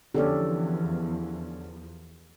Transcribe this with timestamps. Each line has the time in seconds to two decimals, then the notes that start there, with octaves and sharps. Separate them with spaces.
0.14 E2 D3 F3 C#4 G4 A4 D5